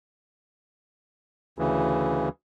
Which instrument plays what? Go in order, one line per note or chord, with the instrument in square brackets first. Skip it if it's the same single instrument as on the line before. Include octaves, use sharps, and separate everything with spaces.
[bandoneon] D2 C#3 E3